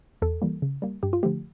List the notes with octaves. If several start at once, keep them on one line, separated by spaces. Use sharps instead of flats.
E2 A4
E3 G3 A#3
C#3
G3 A#3
G2 G4
F4
D3 F3 A3 G4